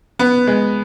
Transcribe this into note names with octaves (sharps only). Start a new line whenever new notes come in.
B3
G#3